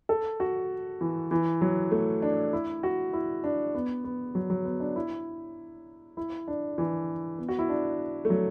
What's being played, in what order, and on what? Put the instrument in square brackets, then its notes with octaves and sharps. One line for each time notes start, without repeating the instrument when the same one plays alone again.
[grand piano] A4
F#4
E3
E3
F#3
A3
D4
E4
F#4
E4
D4
B3
B3
F#3
F#3
B3
D4
E4
E4
D4
E3
B3
F#4
E4
D4
A3
F#3